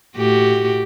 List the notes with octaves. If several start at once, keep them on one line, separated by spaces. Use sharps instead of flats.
A2 F#4 G4